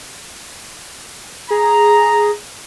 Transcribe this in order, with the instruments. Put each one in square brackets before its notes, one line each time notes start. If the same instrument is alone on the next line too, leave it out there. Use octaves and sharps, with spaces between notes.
[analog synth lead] G#4 [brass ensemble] A#5